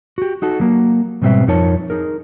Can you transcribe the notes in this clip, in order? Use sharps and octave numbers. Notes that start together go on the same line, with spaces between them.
F#4 G4
D#4 F#4 A4
F#3 A#3
G#2 B2 G3 C4 B4 E5
F2 F3 D#4 A#4 C#5 A5
D#4 G#4 A#4